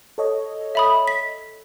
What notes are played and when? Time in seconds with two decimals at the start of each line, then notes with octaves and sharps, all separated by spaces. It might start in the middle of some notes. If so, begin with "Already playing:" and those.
0.18 A4 C#5 D#5
0.75 E5 B5 D#6
1.08 B6